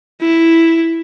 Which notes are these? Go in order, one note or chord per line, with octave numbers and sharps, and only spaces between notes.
E4